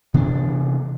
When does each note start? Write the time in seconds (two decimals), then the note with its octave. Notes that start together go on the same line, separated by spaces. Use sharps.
0.14 C3 E3 B3 D4